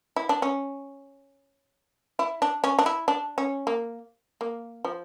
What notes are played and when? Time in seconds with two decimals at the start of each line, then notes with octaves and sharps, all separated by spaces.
0.16 E4
0.29 D4
0.42 C#4
2.19 E4
2.42 D4
2.64 C#4
2.79 D4
2.86 E4
3.08 D4
3.38 C#4
3.67 A#3
4.41 A#3
4.85 F3